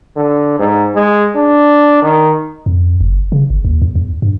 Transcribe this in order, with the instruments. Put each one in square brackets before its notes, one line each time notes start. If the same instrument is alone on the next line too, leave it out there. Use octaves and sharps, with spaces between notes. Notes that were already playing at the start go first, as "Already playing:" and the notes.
[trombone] D3
G#2
G#3
D4
D#3
[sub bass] F2
F#1
C#3
G1
D#2
E2
E2
G2